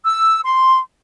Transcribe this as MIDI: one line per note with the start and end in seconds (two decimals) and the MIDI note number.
0.06 0.40 88
0.44 0.79 84